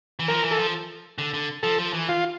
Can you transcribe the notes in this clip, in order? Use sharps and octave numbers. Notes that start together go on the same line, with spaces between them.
E3
F3 A#4
E3
A4
F3
D3
D3
F3 A4
F3
E3
F4